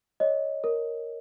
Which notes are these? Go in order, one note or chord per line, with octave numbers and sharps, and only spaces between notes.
C#5 D#5
A#4